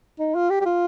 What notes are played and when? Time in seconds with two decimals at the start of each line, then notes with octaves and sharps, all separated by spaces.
0.19 D#4
0.35 F4
0.50 G4
0.61 G4
0.66 F4